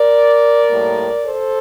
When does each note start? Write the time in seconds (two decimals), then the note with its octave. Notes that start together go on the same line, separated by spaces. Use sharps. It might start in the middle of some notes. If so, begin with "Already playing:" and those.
Already playing: A#4 D5
0.70 A2 G3 A#3
1.24 A4 C5